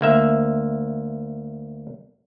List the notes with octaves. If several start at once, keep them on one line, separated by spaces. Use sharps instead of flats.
D2 A#3 E5